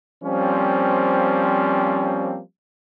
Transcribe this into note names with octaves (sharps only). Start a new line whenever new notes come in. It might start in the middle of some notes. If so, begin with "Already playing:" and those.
F3 G3 A#3 C4 C#4